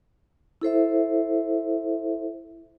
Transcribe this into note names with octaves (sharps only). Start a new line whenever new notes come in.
E4 A4 C5 E5